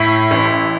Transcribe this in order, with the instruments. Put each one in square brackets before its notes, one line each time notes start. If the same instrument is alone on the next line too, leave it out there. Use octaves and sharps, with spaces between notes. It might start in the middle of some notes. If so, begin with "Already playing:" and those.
Already playing: [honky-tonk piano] A2 [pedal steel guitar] E4
[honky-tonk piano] A1